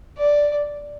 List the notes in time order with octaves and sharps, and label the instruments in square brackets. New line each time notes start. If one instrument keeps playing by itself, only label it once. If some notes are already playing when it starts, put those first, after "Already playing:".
[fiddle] D5